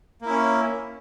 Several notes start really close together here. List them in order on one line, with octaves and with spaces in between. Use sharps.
A#3 E4 C#4